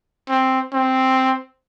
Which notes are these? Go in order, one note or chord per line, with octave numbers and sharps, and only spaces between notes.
C4
C4